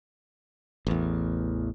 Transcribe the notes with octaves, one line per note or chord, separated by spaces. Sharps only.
A1 E2